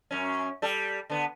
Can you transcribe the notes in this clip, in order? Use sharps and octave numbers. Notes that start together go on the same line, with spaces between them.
F#2 C#4
G3 A4
D3 B3